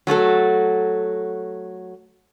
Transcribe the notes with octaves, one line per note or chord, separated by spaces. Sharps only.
F#3 A3 F#4 A4